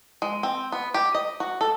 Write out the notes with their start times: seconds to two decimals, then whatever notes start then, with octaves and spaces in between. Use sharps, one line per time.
0.22 G#3
0.43 C4
0.72 B3
0.94 G4
1.15 D#5
1.40 F#4
1.61 A4